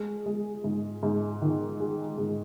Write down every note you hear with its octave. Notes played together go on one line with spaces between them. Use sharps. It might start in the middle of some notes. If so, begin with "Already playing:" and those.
Already playing: G#3
G#3
G#2
G#2
D#3
G#3
G#2